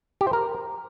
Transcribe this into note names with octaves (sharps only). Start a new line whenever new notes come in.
G4
C5
A#4